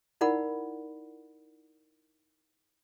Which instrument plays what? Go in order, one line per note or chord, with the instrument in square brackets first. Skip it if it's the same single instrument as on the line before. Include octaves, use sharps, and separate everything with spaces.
[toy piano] D#4 E4 A#4 D5 F#5 B5